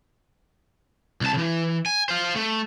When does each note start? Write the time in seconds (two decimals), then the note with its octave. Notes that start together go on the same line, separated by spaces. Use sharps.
1.21 C2 A5
1.34 C#3 E3
1.86 G#5
2.09 C5 F5
2.36 A3